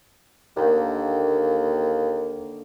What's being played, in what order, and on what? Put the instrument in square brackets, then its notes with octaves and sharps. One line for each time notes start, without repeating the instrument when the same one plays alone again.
[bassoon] D#2 [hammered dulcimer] D3 D#3 A#3